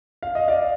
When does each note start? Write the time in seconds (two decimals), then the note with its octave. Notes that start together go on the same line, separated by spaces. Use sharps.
0.23 F5
0.35 D#5
0.48 D5 F5